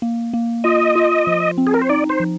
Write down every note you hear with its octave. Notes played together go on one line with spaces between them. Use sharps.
A#3
A#3
F4 D#5
F4
F3
C4
G#4
A#4
C5
D#4 D5
C5
F3